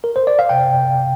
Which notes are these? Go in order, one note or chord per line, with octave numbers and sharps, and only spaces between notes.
A#4
C5
D5
F5
C3 G5
C3